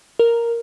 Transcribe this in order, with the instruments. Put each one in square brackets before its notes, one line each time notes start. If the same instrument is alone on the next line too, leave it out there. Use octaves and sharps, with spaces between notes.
[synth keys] A#4